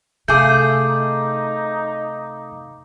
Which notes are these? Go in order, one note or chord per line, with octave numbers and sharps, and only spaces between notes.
C3 A3 G#4 F5 D6 G6
D#4